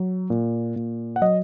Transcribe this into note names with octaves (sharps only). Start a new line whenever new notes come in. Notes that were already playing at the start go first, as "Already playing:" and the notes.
Already playing: F#3
A#2
A#2
F#5
F#3 D#5